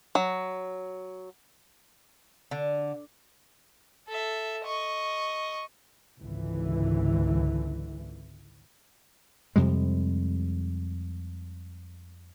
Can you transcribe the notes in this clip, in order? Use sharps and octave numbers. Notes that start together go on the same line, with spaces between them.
F#3
D3
A4 E5
D#5 C#6
G#1 C#2 D3 E3
F2 C3 G3 G#3